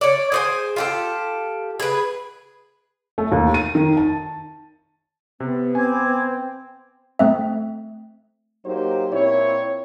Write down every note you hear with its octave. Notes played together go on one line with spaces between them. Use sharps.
C#5 D5
G#4 C5 G#5
F4 G4 A4
G#4 B4
A3
D#2
D#7
D#3
A5
C3 B3
C4 G#5 D6 G#6
A3 C4 E5
F#3 A#3 D#4 G4 C5
A#2 C4 E4 C#5